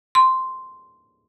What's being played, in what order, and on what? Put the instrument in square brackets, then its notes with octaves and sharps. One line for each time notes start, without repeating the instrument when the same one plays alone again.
[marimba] C6